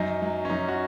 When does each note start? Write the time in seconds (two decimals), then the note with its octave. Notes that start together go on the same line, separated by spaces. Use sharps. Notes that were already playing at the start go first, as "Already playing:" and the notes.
Already playing: F#2 D#4
0.22 F#3
0.45 C#4
0.49 F#2 D#4
0.68 F#4